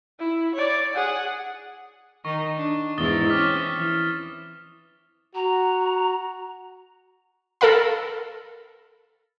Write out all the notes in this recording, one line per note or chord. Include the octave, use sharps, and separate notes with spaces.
E4
C#5 D5
G#4 F#5
D#3 D#4 C#6
D4
E2 G#2 E4 D#6 A6 G7
C4 C#4 D6 F6 B6
E3
F#4 A#5
A4 A#4 F5 B5